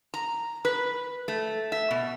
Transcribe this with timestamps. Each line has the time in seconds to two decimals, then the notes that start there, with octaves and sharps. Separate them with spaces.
0.14 A#5
0.65 B4
1.28 A3
1.72 E5
1.91 B2